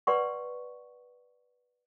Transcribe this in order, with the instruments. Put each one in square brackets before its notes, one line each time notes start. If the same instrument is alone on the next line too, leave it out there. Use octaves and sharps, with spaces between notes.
[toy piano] B4 D5 F#5 C6 C#6